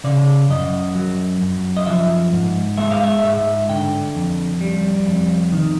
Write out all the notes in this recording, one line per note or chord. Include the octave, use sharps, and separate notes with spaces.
C#3 D5
F#2 D#5
F#3
F#2
D#5
F3 E5
G#2
G#3 E5
F5
E5
G#2 E5
D3 G5
F2
G3
F2
D#3